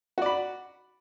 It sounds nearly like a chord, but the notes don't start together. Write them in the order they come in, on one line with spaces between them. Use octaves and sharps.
F#4 D5 B5